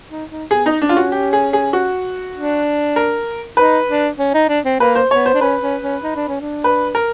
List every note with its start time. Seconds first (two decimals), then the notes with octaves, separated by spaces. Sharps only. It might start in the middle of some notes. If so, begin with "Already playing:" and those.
0.10 D#4
0.31 D#4
0.51 B3 G#4
0.66 D#4
0.82 C#4 D4
0.89 F4
0.97 F#4
1.12 G4
1.33 G#4
1.53 G#4
1.73 F#4
2.35 D4
2.96 A#4
3.57 D#4 B4
3.88 D4
4.19 C#4
4.34 D#4
4.49 D4
4.65 C4
4.80 A#3 B4
4.95 C5
5.11 B3 C#5
5.26 C5
5.34 D4
5.41 C#4 B4
5.62 C#4
5.82 C#4
6.03 D#4
6.16 D4
6.28 C#4
6.41 D4
6.64 B4
6.95 A#4